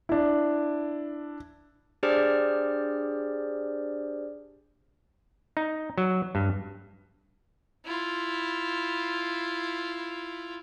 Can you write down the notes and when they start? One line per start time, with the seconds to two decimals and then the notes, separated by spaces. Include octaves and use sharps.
0.09 D4 E4
2.03 D4 G4 G#4 C5 D5 F6
5.57 D#4
5.98 F#3
6.35 G2
7.85 E4 F4